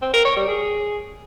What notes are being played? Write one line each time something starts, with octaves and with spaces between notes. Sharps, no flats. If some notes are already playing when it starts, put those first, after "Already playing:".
C4
A#4
C#5
G3
G#4